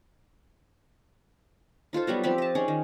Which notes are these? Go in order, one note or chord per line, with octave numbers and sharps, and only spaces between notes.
D#4 F4 A4 C5
F#3 G3 B3 F#4
F3 C4 G4 E5
D#5 A5
C#4 D#4 G#4 D5
D#3